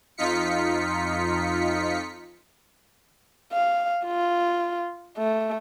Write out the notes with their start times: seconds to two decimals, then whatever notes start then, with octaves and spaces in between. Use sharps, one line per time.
0.17 F2 D#4 F4 B6 C#7
3.52 F5
4.06 F4
5.18 A3